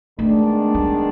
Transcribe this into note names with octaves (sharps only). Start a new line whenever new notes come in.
D#3 G#3 A3 B3 D4
G3